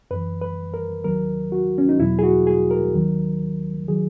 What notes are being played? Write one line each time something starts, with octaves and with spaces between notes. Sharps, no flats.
F#2 E3 B4
B4
A#4
D#2 D#3 F#3 A#4
F#4
C#4
D#4
E2 B2 F#3 E4
G#4
F#4
G#4
A#4
D#2 D#3 F#3
D#3 F#3 G#4